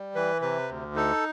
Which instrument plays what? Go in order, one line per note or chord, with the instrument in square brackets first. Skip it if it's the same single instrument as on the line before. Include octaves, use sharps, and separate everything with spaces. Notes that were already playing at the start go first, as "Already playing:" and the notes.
Already playing: [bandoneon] G3
E3 B4
C3 B4
D2
D#4 A4